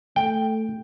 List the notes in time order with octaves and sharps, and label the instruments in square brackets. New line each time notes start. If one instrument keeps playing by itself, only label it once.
[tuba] A3 [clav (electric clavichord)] G5